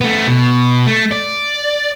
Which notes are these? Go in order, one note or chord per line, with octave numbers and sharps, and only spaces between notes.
A3 B3
B2
A3
D5